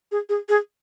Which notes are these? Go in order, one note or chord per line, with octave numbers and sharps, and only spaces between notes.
G#4
G#4
G#4